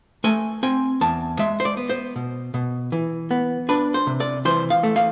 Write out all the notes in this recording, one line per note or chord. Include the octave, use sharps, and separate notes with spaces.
A3 G#5
C4 G#5
E2 A5
G#3 E5
C5
D5
B3
C5
B2
B2
E3
B3
D4 B4
C5
C3
D5
E3 C5
F5
A3
F5